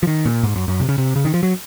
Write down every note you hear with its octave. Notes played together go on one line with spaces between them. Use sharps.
F3
D#3
A#2
G#2
F#2
F#2
C3
C#3
C3
C#3
D#3
F3
F#3